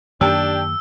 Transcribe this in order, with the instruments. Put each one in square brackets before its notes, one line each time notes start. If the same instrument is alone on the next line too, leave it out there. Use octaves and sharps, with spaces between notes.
[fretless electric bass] F#2 D#3 A#3 [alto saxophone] D4 [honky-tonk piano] G4 G5 A5 [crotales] E6